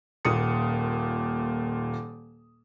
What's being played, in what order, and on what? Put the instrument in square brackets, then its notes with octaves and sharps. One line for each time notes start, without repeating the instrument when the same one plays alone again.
[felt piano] D#1 A#2 D#6 C#7